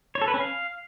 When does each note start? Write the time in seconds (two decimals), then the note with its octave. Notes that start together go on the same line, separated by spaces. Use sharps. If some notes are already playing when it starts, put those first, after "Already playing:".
0.15 C#5
0.22 A4
0.28 B4
0.34 C#4
0.40 F5